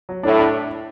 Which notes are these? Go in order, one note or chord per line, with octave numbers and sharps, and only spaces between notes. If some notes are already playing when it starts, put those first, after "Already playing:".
F#3
A2 D4
D4